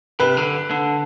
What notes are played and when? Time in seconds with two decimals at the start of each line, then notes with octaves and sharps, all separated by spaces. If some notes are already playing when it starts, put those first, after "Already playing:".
0.20 C3 B4
0.37 D3
0.71 D3